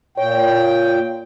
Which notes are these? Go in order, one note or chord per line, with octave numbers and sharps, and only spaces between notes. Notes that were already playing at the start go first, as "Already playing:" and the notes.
A#2 C#5 G5